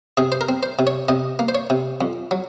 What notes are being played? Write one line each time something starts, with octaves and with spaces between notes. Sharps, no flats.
C3 G#4
C5
A#4
C4
C5
C3
C#5
C3 D#5
A#3
C5
C#5
C3
F2
F#3